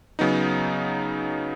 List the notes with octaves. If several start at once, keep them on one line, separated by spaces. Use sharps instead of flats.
C#3 F#3 B3 D#4